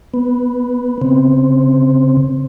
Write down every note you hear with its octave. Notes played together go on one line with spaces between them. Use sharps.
B3
C#3 C4